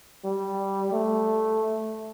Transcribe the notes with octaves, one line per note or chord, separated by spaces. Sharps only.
G3
A3